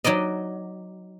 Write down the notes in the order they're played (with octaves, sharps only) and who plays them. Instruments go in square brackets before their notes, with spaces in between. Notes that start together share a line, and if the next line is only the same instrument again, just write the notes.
[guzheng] F#3 D#4 D5 D#5